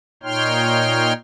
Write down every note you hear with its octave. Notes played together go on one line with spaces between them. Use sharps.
A#2 D#4 C#5 G5 C6 F6